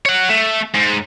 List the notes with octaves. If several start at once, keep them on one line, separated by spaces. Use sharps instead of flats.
C#5 F#5
A3
G#2